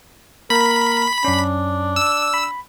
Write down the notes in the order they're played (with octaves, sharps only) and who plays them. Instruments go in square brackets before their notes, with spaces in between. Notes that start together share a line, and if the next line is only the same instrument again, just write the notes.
[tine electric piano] A#3 [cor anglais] A#4 [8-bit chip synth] B5
[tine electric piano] F#2 C#4 [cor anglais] D4
[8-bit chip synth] E6
[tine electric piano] B5